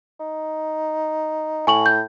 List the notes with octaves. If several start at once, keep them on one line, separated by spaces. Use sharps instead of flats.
D#4
A2 G#5 C#6 F#7
G6